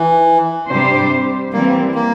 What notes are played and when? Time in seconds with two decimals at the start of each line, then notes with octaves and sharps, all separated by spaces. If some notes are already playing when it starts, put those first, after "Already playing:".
Already playing: E3
0.70 C3 G3 D4 G4 C5
1.53 E3 G3 A#3 C4
1.95 A#3